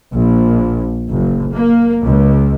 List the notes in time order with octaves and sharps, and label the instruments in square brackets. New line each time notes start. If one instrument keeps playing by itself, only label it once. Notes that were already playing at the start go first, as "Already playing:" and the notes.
[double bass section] A#1
F#1
A#3
C#2